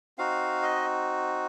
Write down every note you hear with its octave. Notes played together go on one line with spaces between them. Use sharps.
C4 D#4 F#4 F5
D#5